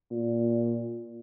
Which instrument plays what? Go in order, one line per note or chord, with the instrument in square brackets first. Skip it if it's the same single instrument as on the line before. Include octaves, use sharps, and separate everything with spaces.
[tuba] A#2